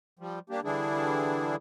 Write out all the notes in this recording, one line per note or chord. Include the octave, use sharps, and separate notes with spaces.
F3 G3
G3 A#3 D4 G4
D3 E3 G3 D4 E4 G#4